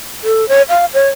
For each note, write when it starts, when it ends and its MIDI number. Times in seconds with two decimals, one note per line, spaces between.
0.24 0.47 69
0.49 0.62 73
0.69 0.85 77
0.94 1.09 73